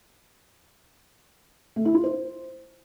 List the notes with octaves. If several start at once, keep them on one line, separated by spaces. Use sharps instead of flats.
A3
E4
F4
C5